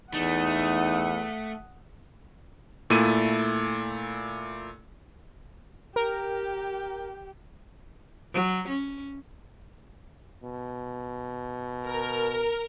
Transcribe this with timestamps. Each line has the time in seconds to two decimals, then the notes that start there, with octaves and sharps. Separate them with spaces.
0.14 E2 A3 D#4 F#5 D#6
2.90 A#2 A3 E4 D#7
5.96 G4 A#4
8.33 F#3
8.68 C#4
10.43 B2
11.87 A#4